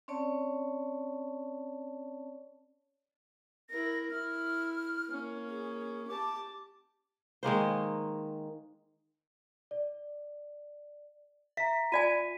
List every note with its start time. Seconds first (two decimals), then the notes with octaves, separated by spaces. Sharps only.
0.08 C4 C#4 C#5 D5 A5
3.70 E4 A#4 A#6
4.11 E4 F6
5.09 A#3 C#4
5.49 G#4
6.08 G4 A5 D6
7.43 D#3 G#3 A#3 C5
9.71 D5
11.57 E5 A#5 B6
11.92 F4 D5 G#5 B6 D#7